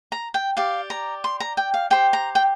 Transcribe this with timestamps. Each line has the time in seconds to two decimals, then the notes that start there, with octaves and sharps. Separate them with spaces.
0.12 A#5
0.34 G5
0.57 G4 D5 F5
0.90 A#5
1.24 C6
1.40 A#5
1.57 G5
1.74 F5
1.90 G4 C5 G5
2.13 A#5
2.35 G5